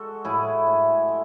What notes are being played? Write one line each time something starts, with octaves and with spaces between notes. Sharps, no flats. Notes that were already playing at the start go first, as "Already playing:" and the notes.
Already playing: G#3 F#4 A4
A2 E4 G#4
A2
G#3